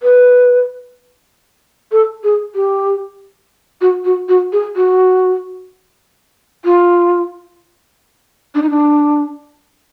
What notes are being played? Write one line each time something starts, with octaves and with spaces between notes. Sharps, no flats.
B4
A4
G#4
G4
F#4
F#4
F#4
G#4
F#4
F4
D4
D#4
D4